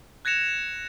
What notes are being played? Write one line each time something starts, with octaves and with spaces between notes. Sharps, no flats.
F#6 G#6 A#6 C#7 E7 F7